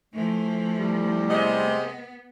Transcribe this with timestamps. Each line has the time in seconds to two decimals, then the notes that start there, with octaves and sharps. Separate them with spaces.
0.13 E3 F3 A3
0.77 E2 G3
1.28 C3 G#3 B3 D#5